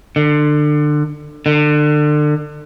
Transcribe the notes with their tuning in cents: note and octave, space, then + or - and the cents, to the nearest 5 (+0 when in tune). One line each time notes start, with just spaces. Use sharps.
D3 +25
D3 +30